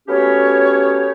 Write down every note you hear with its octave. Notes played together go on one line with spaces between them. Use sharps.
A3 B3 C#4 F#4 G4 C#5